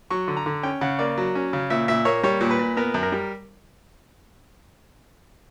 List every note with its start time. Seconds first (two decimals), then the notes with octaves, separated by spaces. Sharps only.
0.11 F#3 C#6
0.28 D3
0.37 A#5
0.46 D3
0.63 C#4 G5
0.81 C#3 F#5
0.99 A#3 D5
1.18 F#3
1.35 C#4
1.53 C#3
1.70 A#2 E5
1.88 A#2 E5
2.05 A#3 C#5
2.23 G3 C#5
2.41 A#2
2.51 B4
2.59 A#2
2.77 B3 A#4
2.94 F#2
3.03 A#4
3.12 G3